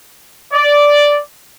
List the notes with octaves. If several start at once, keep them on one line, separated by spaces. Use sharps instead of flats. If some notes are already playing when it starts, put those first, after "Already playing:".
D5